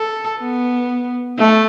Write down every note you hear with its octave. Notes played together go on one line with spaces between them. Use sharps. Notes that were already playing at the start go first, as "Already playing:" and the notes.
Already playing: A4
B3
A3